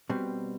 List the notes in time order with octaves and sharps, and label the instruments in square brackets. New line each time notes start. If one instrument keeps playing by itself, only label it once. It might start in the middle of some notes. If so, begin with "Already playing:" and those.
[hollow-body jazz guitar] B2 G3 C4